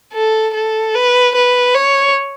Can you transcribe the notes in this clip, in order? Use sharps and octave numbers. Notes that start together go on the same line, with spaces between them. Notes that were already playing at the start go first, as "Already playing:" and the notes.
A4
A4
B4
B4
C#5